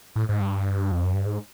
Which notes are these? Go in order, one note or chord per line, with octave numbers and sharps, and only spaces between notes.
A2
G#2
G2
F2
F#2
G2
G#2